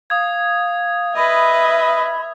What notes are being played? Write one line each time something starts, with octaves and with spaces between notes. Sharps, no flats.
F5 D#6 G#6
B4 D#5 E5 B5